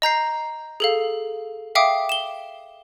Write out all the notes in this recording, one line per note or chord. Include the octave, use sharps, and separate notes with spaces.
D#5 A#5 G6 C7
G#4 A4 F5
E5 F5 G5 D6 D#6
E7 G7